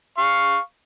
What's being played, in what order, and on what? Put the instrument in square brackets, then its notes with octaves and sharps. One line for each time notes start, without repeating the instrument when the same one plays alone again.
[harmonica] F5 C#6